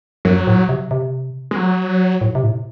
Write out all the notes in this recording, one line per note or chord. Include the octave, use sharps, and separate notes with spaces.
F#2 F#3
A2
C3
C3
G#3
F#3
A2
C3
A2